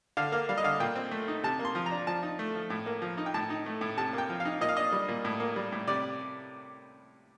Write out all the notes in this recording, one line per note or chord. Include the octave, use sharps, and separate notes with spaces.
D3 F5
A#3 F5
G3 F5
D#5
D3 F5
A#2 G5
C4
A3
D#4
C3 A5
A#3
C6
F3
A#5
D4
F3 A5
D#4
A3
F3
A2
A#3
F3
D#4
G5
A2 A5
D#4
A3
A2
C3 A5
A#3 G5
F3
F5
D#4
A#2 D#5
F5
D4 D#5
G3
A#2
A2
A#3
G3
A2
C3 D5